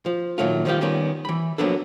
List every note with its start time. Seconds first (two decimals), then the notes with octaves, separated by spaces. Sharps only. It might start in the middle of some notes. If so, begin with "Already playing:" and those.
0.06 F3
0.38 A#2 D#3 F#3 A3 F4
0.65 D#3 F3 G3 D#4 F4 G4
0.81 D#3 G3 B3 C#4
1.25 E3 B5
1.58 F3 F#3 A#3 B3 D4 A4